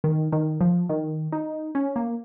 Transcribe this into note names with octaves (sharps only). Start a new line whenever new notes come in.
D#3
D#3
F3
D#3
D#4
C#4
A#3